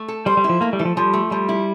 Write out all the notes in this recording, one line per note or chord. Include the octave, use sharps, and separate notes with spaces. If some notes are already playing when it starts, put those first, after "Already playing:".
Already playing: A3
A4
G3 C5
G3
E4
F3
A3 A#3
G3
E3 A4
F3
F3 G3
A3
F3 G3
E4